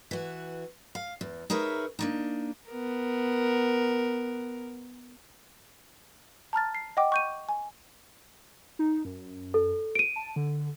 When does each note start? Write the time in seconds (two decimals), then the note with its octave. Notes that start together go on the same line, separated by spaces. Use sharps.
0.11 E3 F#4
0.95 F5
1.21 E2
1.50 D#4 G#4 A#4 B4 C#5 E5
1.99 A#3 D4 D#4
2.70 B3 A#4
6.53 A5 A#5 F6 A6
6.75 C7
6.97 D#5 F#5 G5 D6
7.12 C#6 G6 D#7
7.49 G#5
8.79 D#4
9.05 F#2
9.54 A4
9.95 D7 D#7
10.16 A5
10.36 D3